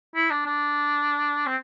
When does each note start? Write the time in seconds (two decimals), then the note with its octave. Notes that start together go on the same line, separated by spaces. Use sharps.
0.15 E4
0.30 D4
0.46 D4
1.46 C4